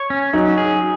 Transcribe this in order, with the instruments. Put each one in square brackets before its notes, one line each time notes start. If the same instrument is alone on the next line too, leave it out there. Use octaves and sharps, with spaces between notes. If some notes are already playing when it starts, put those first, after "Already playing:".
Already playing: [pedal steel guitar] C#5
C#4
[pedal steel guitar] F#3 [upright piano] D#4
[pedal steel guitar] G#4